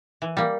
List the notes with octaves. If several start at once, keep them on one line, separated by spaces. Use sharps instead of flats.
E3
G3 A#3